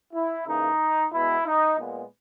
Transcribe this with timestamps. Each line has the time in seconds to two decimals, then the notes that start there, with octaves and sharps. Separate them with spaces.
0.14 E4
0.46 C#3 E3 A#3 D#4
1.13 B2 G#3 B3 E4
1.46 D#4
1.79 A#2 G#3 B3